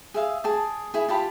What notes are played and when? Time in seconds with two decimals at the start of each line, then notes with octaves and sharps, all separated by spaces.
0.14 G#4 E5 F5
0.44 G#4 A5 D6
0.94 E4 G#4
1.08 F4 G4 A5 B5